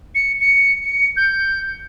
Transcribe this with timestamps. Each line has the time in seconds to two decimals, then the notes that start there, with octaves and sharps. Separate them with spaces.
0.15 C#7
0.41 C#7
0.85 C#7
1.17 G6